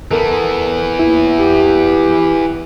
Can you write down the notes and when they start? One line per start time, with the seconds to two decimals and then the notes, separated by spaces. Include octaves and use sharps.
0.11 E3 B3 A4 A#4
0.99 D#2 E4
1.36 G4